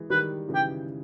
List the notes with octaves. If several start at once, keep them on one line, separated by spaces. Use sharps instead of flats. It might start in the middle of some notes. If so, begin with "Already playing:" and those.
Already playing: E3 G#3
D#3 G3 B4
C#3 E3
G5